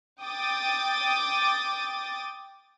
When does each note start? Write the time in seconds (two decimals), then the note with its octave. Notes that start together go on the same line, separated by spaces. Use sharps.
0.22 G5 D6 D#6 A6